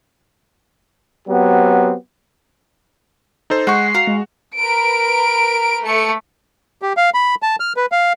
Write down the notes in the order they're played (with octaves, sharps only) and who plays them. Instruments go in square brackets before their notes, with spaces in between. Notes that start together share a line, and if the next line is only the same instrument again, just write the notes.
[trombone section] F#3 B3 C4 G4
[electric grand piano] D#4 A4 C5
[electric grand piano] G#3 C#6 [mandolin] F#4 G6 [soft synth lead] C7
[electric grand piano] F#4 [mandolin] F5 A#5
[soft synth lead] G#3
[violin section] A#4 B4 D7
A3 C#7
[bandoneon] G4
F5
B5
A5
F6
B4
F5